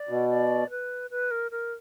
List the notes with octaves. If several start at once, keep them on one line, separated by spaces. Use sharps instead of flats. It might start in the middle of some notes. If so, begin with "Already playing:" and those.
Already playing: D5
B2
D5
B4
B4
A#4
A#4